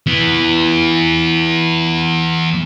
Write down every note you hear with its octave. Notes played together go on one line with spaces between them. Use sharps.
E3 B3